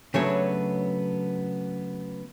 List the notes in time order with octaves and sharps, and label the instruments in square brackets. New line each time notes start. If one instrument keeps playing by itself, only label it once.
[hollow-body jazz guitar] C#3 F#3 A3 B3 D4 C#5